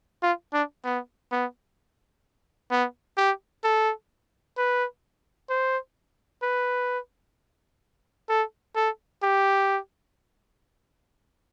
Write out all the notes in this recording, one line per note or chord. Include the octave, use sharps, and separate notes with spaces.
F4
D4
B3
B3
B3
G4
A4
B4
C5
B4
A4
A4
G4